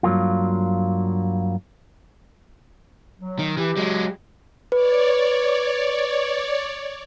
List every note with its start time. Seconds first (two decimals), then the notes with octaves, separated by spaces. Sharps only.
0.03 G2 F#3 G#3 A#3 F4
3.19 F#3
3.39 D#3
3.57 E3 G4
3.77 F#3 G#3
4.72 B4 C#5 D5